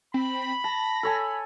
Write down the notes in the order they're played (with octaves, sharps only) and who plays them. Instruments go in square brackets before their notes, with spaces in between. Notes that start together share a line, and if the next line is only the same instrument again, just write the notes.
[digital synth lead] C4 [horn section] B5
[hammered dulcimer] A5 [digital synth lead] A#6
[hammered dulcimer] A4 C#5 G#5